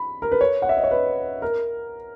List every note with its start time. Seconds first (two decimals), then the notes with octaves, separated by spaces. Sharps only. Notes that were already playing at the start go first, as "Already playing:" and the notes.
Already playing: B5
0.22 A#4
0.32 B4
0.41 C#5
0.62 F#5
0.69 E5
0.77 D#5
0.84 C#5
0.91 B4
1.42 A#4